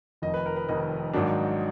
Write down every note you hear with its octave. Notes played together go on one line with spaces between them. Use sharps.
F1 F2 D#3 D#5
B4
A#4
B4
F1 F2 D#3 D#5
G#1 G#2 D#3 F#3 D4